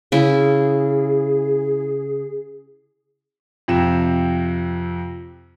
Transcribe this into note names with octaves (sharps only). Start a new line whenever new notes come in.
C#3 E4 G#4
F2 C3 E7